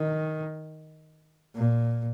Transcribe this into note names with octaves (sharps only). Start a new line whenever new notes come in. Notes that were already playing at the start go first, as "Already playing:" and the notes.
Already playing: D#3
A#2